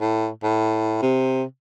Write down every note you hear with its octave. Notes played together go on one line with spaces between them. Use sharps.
A2
A2
C3